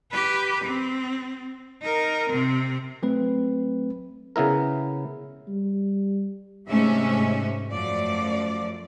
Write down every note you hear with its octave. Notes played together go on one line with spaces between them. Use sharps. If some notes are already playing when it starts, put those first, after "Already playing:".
G4 B4
C4
D#4 A#4
C3 C4
F#3 A3 C4 B4
C#3 B3 E4 A#4
G3
G#2 C3 A3 C#4 E5
F#2 F3 A3 D5